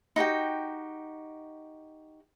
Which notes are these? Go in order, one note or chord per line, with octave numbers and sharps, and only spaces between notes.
D#4 F#4 G4 G5